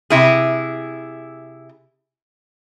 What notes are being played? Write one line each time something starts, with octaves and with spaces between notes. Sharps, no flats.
C3 E4 G#4